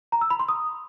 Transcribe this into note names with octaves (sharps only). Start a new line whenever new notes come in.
A#5
E6
B5
C6
D#6